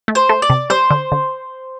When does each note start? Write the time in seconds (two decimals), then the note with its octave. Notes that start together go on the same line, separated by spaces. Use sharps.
0.08 A3
0.15 C5
0.29 A3
0.42 D5
0.50 C3
0.70 G3 C5
0.91 D3
1.12 D3